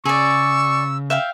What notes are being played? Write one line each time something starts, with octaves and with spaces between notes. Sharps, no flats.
C#3 G#4 D5 C#6 E6
E5 F5 G5